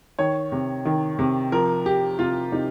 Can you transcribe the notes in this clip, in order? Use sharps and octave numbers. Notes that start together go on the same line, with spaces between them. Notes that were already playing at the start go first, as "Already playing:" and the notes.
D#3 C#5
C3
D#3
C3
F3 A#4
F3 G4
C3 F4
C3 D#4